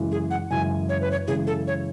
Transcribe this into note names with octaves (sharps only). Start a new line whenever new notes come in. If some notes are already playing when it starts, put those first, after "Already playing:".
Already playing: F#2 C#3 E3 G#3
G#4
F#5
F#2 C#3 E3 G#3 G#5
C#5
B4
C#5
F#2 C#3 E3 G#3 G#4
A4
C#5